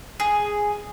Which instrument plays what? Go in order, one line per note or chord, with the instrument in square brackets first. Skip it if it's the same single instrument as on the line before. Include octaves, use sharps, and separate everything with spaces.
[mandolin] G#4